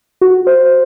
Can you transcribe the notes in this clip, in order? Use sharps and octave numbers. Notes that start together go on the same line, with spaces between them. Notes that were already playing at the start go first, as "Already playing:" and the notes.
F#4
C5